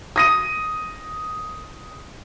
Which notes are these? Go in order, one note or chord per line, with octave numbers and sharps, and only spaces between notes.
D#6 A#6 D#7